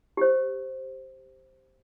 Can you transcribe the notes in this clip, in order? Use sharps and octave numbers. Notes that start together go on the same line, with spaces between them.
G4 C5